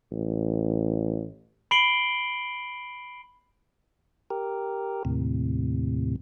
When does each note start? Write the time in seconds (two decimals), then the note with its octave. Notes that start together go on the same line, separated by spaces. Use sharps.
0.11 A1
1.71 B5 C7 D7 F#7 G7
4.30 G4 A#4
5.05 D#2 A2 C3